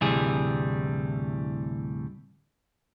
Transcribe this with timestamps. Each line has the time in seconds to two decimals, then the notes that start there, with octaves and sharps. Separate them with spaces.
0.01 D2 A2 C3 E3 G3 G#4